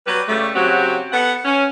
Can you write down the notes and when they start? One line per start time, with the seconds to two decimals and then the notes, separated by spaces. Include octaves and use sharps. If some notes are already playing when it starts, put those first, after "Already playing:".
0.07 F#3 G3 B4
0.28 C#3 G3 A3
0.55 C#3 F#3 C4 F#4 G4
1.12 B3 A4 F#5
1.45 C#4